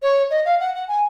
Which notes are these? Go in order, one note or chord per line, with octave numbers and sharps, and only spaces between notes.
C#5
D#5
F5
F#5
F#5
G#5